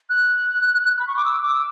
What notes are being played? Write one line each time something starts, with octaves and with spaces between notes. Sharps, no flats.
F#6
B5
C#6
D6
E6
D6
E6